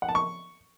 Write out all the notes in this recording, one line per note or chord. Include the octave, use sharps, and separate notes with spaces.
F#5
A5
C#6